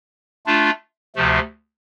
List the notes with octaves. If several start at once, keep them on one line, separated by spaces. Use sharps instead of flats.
A3 D4 F4
D2 C3 F3 A3